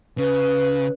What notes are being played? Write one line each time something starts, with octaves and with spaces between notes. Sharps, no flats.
C#3 B4